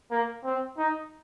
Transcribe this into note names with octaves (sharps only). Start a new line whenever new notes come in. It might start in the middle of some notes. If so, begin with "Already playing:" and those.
A#3
C4
D#4